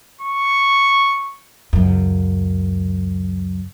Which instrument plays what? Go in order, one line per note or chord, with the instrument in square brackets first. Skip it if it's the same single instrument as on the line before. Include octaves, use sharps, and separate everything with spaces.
[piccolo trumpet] C#6
[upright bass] C#2 F#2